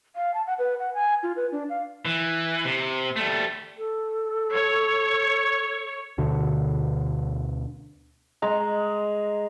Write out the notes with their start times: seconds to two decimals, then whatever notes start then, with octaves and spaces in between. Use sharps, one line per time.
0.16 F5
0.34 A5
0.47 F#5
0.59 B4
0.79 F#5
0.94 G#5
1.23 F4
1.36 B4
1.52 D4
1.69 F5
2.05 E3
2.65 C3
3.16 G3 A3
3.78 A4
4.53 C#5
6.18 D2 B2 D3
8.42 G#3 A#5